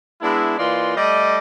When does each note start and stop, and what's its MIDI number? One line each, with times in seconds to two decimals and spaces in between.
0.22 0.56 56
0.22 0.56 59
0.22 0.56 62
0.22 0.56 64
0.58 0.93 52
0.58 0.93 58
0.58 0.93 65
0.58 0.93 74
0.58 0.93 75
0.58 0.93 84
0.96 1.38 55
0.96 1.38 57
0.96 1.38 74
0.96 1.38 75